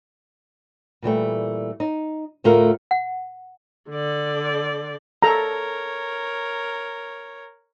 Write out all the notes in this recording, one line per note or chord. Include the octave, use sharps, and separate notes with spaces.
A#2 E3 G3 A3
D#4
D2 A2 A3 F4 A#4
F#5
D3 D5
A4 A#4 C#5 A#5